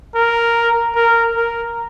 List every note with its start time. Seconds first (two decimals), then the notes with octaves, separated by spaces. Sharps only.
0.15 A#4
0.95 A#4
1.35 A#4